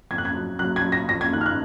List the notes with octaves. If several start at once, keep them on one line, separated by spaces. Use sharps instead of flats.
F2 G#6
F#6
G#6
F#3
F#3 F#6
G#6
F#3
A#6
F2 A#6
G#6
D#3 F#6
F6
F#6